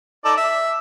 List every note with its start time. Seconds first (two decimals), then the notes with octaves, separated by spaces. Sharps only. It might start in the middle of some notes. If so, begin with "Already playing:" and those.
0.25 D#4 A4 D5
0.37 E5